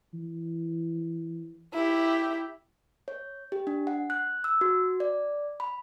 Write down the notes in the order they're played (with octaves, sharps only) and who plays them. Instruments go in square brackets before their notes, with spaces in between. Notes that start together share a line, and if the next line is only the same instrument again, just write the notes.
[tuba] E3
[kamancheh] E4 G4
[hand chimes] C#5
G4
D4
F#5
F#6
E6
F#4
D5
B5